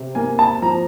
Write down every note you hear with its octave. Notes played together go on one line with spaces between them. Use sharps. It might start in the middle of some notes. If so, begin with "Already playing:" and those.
Already playing: C3
A#3 G#5
A5
F3 A#5